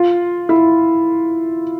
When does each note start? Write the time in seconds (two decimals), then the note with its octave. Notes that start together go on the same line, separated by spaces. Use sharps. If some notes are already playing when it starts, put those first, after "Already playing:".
Already playing: F4
0.49 E4